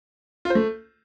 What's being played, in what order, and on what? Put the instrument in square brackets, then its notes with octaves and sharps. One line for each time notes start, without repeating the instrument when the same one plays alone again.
[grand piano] F4
C5
A3